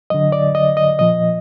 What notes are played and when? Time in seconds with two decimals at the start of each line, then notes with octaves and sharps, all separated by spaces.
0.10 D3 F#3 D#5
0.32 D5
0.55 D#5
0.77 D#5
0.99 A#2 F3 D#5